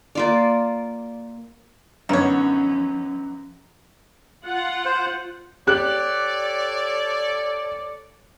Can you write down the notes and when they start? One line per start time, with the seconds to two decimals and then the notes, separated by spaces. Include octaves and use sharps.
0.15 A#3 F4 D5
2.09 F#2 D3 D#3 F3 B3 C#4 C#5
4.44 F4 F#5
4.85 C5
5.67 G4 A4 C#5 D5 F#6